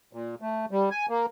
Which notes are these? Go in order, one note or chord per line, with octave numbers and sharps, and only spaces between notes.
A#2
A3
G3
G#5
A#3